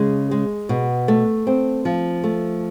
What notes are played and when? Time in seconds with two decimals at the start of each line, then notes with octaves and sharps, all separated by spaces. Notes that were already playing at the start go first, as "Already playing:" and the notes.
Already playing: C#3 G#3
0.31 G#3
0.69 B2
1.08 A3
1.47 C4
1.85 F3
2.24 A3